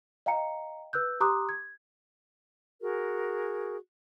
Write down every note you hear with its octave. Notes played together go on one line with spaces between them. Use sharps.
D#5 F5 G5 A#5 C#7
B4 E6 F#6 G6
G4 A#5 C6 D6 D#6 F#6
G#6
F#4 G#4 A#4